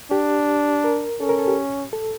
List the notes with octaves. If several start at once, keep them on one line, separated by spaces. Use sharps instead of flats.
D4 G4
A#4
C#4 A4
A#4
A4
G4
A4